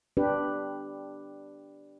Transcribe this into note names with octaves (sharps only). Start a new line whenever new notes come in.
D4 G4 B4